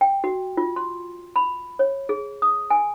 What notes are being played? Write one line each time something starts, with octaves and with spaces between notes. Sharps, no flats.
G5
F#4
F4
C6
B5
C#5
G#4
D#6
G#5